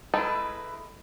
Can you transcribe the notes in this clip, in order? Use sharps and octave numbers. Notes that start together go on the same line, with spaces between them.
G#3 D#4 E4 A4 B4